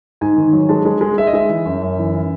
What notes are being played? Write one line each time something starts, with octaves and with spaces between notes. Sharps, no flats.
G#2 G#5
D#3
F#3
G#3 A5
G#3
G#3
G#3 E5
D#5
G#3 E5
E3
F#2
F#2
E3
E3